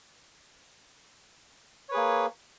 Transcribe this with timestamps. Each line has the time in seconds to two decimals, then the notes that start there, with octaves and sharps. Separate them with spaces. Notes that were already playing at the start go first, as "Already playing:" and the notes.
1.89 C#5
1.91 B4
1.94 G#4
1.97 A#3